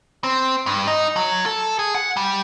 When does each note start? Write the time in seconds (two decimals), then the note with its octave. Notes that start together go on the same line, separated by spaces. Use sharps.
0.24 C4
0.66 G2
0.87 D#4
1.16 F#3
1.46 A4
1.79 G#4
1.95 F#5
2.17 G3